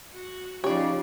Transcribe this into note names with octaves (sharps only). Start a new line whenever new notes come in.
F#4
C#3 F3 C#4 D#4 F4 G4 C#5 D5